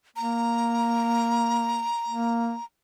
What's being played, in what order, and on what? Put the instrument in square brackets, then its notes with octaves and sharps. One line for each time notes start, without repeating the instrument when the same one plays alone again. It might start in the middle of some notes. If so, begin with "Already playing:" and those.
[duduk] A#3 [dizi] A#5
[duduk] A#3